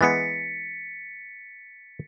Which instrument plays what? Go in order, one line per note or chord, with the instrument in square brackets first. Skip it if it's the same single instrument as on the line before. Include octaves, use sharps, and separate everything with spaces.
[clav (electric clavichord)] E3 G#3 B3 [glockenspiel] A6 B6 C#7